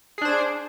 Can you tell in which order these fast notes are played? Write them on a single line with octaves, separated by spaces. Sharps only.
G#4 D4 C5